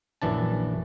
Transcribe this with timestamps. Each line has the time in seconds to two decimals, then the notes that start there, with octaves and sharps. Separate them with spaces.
0.22 A#1 F#2 E3 D4 A5